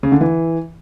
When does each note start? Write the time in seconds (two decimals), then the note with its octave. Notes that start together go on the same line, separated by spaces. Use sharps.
0.03 C#3
0.12 D3
0.21 E3